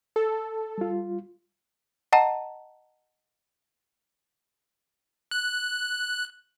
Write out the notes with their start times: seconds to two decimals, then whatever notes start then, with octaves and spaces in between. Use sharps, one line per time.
0.16 A4
0.78 G3 F4
2.13 D#5 F#5 A5 A#5
5.31 F#6